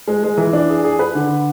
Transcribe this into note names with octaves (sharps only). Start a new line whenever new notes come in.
G#3
G#3
E3
D4
G#4
G#4
B4
D3